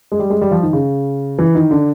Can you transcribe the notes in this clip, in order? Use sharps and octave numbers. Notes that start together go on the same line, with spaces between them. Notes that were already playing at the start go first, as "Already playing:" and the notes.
G#3
G3
G#3
G3
F3
D#3
C#3
E3
D#3
D3